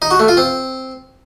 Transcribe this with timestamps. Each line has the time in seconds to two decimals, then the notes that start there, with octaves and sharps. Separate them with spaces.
0.02 D#4
0.11 F#4
0.20 A3
0.28 F4
0.37 C4